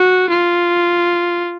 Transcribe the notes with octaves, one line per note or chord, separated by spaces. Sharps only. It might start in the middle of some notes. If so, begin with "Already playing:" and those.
Already playing: F#4
F4